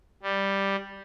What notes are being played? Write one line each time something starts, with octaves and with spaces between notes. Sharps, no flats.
G3